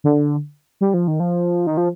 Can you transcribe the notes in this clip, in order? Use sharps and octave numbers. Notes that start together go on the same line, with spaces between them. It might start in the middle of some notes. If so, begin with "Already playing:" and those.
D3
G3
F3
D#3
F3
D#3
F3